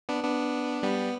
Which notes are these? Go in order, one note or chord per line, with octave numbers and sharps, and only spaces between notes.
B3 D4
B3 D4
G3 B3